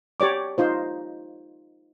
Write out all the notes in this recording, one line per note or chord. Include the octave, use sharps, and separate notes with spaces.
G4 C#5 D5 D6
D#4 F4 C5